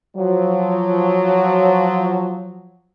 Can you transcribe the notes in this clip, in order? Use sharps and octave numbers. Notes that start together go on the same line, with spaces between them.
F3 F#3